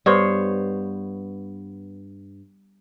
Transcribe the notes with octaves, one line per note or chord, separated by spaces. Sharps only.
G2 B3 C5 C#5